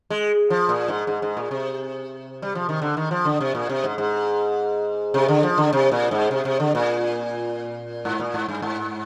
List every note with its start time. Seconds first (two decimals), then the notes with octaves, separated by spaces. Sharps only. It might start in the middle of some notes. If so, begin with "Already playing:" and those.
0.10 G#3
0.50 F3
0.69 A#2
0.88 G#2
1.07 G#2
1.22 G#2
1.37 A#2
1.51 C3
2.42 G3
2.55 F3
2.69 D#3
2.82 D3
2.97 D#3
3.11 F3
3.25 D3
3.41 C3
3.55 A#2
3.69 C3
3.84 G#2
3.98 G#2
5.14 C3
5.28 D3
5.43 F3
5.58 D3
5.73 C3
5.92 A#2
6.11 G#2
6.31 C3
6.45 C3
6.60 D3
6.75 A#2
8.05 G#2
8.20 A#2
8.34 G#2
8.48 G2
8.62 G#2